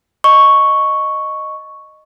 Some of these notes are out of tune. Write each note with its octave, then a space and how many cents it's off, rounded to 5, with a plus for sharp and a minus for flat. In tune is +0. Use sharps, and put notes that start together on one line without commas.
D#5 -10 C#6 +0